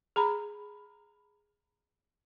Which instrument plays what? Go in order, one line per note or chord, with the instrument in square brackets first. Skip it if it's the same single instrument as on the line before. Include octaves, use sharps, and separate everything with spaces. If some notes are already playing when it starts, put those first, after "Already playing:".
[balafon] G#4 A#5 B5